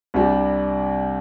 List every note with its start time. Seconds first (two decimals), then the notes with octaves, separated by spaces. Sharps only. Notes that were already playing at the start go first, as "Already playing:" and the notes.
0.14 C2 C3 G3 D4 G4